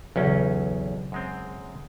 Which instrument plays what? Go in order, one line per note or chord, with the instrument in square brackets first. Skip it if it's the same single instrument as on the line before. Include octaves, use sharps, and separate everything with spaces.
[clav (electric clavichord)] B1 E2 C#4 [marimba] C#3 F#3
[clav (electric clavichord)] F#2 G#3 C4